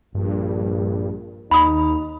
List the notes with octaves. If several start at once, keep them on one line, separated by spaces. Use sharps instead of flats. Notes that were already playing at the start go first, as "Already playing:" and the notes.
A#1 G2
D#2 D#4 B5 D#6